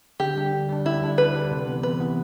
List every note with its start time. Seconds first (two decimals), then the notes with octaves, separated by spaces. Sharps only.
0.20 D3 G4
0.36 G3 D4
0.52 D3
0.69 G3 D4
0.85 D3 E4
1.02 G3 D4
1.18 D3 B4
1.35 G3 D4
1.51 C3
1.67 E3 B3
1.83 C3 B4
2.00 E3 B3